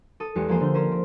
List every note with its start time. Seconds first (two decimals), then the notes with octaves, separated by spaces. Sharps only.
0.20 A4 D#6
0.35 E2 G#3 G4 C#7
0.48 F3 A#3 G#4 C5 F5
0.60 D3 G6
0.74 C#4 A#4 C5 C#5
0.91 C4